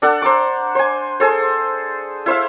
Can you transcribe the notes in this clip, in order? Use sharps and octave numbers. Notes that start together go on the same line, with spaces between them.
D4 A4 F#5
C5 A#5 D6
C5 G#5
G#4 A4 C5
E4 C5 E5 F5